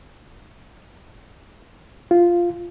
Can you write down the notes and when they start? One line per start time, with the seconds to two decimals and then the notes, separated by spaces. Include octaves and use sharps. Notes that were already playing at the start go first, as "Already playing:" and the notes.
2.11 F4